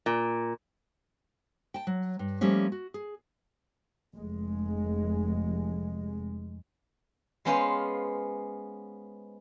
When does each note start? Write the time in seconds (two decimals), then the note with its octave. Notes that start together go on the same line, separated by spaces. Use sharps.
0.06 A#2
1.74 G5 A5
1.87 F#3
2.19 G2
2.41 F3 G3 A3 A#3 C#4
2.72 F#4
2.94 G#4
4.16 F1 G#3
7.45 G#3 B3 C#4 C5 F5